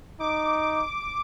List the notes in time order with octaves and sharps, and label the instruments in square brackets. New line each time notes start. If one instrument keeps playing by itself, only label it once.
[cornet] D#4 [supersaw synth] D6